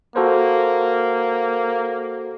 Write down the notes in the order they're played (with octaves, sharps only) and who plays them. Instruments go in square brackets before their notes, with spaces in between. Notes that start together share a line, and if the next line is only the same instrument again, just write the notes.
[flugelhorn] A#3 [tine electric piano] F#4 A4 C5